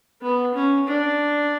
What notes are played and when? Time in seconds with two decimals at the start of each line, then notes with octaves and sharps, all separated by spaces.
0.21 B3
0.54 C#4
0.88 D4